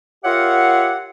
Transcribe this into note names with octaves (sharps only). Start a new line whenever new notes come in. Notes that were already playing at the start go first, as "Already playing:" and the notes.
F4 G4 A#4 C#5 E5 F#5